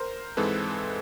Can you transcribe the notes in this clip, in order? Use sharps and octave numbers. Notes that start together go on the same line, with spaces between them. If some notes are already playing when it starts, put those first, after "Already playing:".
Already playing: A#4 C5
G#2 E3 G#3 C4 A4 B4